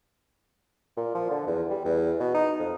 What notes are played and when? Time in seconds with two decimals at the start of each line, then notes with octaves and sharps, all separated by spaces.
0.97 A#2
1.15 F3
1.30 D3
1.47 E2
1.70 G3
1.85 E2
2.20 B2
2.34 D#4
2.59 F2